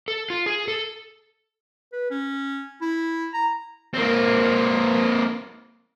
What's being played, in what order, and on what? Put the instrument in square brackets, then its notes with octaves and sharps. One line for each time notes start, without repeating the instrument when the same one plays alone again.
[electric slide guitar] A4
F4
G#4
A4
[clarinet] B4
C#4
E4
A#5
[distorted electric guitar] A#3 C4